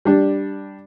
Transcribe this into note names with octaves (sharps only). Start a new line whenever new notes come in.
G3 D4